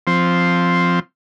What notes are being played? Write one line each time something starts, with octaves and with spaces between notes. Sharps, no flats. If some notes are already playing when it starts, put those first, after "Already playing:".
F3 C4